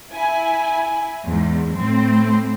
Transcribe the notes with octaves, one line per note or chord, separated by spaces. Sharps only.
E4 G#5
E2 G#2
A2 C4